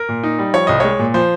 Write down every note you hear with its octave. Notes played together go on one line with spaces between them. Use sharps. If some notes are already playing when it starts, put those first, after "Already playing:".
Already playing: A#4
A#2
D#4
G3
F3 C#5
C2 D#5
G#3 C#5
A#2
F3 C5